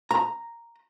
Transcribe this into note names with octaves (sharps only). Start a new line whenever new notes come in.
A#5